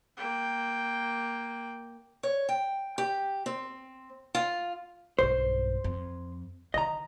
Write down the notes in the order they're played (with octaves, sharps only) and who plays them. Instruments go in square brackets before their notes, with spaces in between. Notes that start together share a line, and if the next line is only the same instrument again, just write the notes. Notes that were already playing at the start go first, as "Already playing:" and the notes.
[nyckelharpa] A#3 G5
[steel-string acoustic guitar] C#5
G5
G4
C4
F4
[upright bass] B1 G2 [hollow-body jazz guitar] C5
[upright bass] F2
[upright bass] D3 D#3 [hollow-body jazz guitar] D#5 A#5